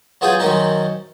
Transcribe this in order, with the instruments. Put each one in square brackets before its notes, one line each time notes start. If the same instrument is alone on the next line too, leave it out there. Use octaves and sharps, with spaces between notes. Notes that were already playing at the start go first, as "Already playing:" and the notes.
[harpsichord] F#3 B3 F4 G#4 G5 D#6
F#2 D#3 C4 C#4 D#4